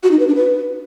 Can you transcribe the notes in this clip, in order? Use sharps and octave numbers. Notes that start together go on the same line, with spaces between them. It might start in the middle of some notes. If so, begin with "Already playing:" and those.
F#4
D#4
B4
D4
B4